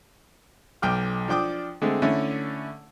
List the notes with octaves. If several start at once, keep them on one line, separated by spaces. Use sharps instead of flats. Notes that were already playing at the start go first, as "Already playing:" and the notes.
B1 G5 D6 F6
F3 D4 G5 D6 D#6
D3 G#3 A3 C4
D3 A3 C#4 E4